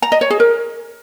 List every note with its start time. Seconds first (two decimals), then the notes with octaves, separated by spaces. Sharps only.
0.02 A#5
0.12 D#5
0.21 C#5
0.30 G#4
0.40 A#4